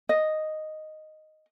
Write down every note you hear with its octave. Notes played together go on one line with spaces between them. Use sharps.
D#5